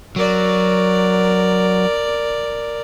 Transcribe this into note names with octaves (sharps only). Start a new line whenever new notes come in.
F#3 A#4 D5